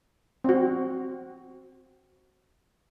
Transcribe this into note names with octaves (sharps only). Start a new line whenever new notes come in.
C4 F#4